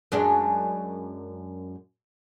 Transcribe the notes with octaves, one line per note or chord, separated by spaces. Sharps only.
F#2 G#3 D4